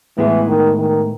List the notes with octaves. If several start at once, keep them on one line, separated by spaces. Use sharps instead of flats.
A2 E3 G#3 B3 E4 G#4
D#3
D#3